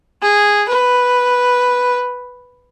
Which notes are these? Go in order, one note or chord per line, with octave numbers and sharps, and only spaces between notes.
G#4
B4